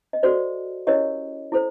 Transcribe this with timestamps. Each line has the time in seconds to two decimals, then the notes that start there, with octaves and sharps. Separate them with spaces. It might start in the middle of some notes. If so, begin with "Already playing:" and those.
0.13 D#5
0.23 F#4 A4 C5 D5
0.87 C#4 E4 G4 A#4 C#5 D#5
1.52 E4 A4 C5